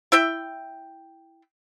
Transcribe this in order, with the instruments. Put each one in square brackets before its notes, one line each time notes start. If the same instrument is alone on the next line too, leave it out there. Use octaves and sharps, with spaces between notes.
[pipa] E4 E5 G5